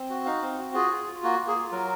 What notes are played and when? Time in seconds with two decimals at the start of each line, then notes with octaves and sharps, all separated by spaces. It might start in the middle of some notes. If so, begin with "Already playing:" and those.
Already playing: C4
0.10 F#4
0.25 D#4 F5
0.42 C4
0.59 F#4
0.74 F4 G#4
0.91 F4
1.07 F4
1.23 A#3 F#4
1.40 A#3
1.47 G#4
1.56 F4
1.72 F#3 A#4